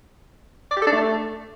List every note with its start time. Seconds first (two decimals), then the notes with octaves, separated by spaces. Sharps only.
0.71 D5
0.76 G4
0.82 A4
0.87 D4
0.92 A3